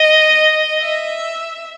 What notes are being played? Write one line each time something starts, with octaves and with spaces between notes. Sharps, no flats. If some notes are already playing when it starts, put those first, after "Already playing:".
Already playing: D#5
E5